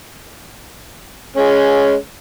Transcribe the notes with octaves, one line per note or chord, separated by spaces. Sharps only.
G#3 C#4